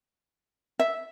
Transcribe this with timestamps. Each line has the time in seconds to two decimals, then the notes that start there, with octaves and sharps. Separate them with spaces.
0.79 E5